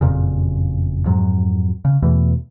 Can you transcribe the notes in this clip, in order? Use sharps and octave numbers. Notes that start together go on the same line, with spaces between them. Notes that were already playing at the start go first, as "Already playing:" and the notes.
F#1 F2 A#2 C#3
F2 G#2 F#3
C#3
E2 B2 E3 A3